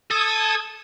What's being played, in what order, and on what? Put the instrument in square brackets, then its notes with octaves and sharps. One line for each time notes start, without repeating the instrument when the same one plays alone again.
[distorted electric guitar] A4 [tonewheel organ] D#6 G#6